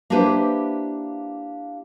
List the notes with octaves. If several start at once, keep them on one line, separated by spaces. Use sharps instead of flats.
A#3 D4 E4 G4 B4 C5